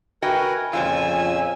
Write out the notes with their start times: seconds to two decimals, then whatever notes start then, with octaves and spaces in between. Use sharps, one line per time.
0.22 F#4 A#4 B4 D#5 G5 G#5
0.73 F2 A#2 C#3 F3 F4 G#5 E6